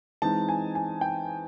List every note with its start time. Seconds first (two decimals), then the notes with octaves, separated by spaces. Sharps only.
0.22 E3 G#3 C4 D#4 A5
0.49 G#5
0.75 G#5
1.01 G5